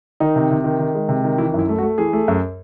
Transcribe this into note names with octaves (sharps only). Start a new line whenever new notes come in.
D#3 D#4
C3
C3
D#3
D#3
G#3
C3
D#3
E3 E4
F#2 E4
A3
F#4
A3
E3 G#4
A3
F#2